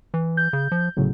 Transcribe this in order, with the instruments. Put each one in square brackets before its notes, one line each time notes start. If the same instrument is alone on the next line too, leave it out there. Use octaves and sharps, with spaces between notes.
[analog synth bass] E3
[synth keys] G6
[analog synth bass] C#3
F3
[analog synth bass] G1 [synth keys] A2 C#3 F#3